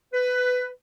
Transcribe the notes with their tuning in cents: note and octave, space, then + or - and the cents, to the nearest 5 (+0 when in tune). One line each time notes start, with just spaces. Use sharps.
B4 +15